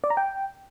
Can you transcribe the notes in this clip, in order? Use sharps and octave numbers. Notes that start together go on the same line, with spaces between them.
D5
A#5
G5